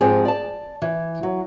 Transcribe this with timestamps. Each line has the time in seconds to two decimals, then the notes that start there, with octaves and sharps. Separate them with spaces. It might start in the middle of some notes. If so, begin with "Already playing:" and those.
0.01 G#2 F3 C4 G4 G#4
0.25 D5 A5
0.82 E3
1.23 F#3